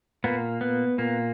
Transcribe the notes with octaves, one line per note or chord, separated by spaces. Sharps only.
A#2 A#3 B3
B3
A#2 A#3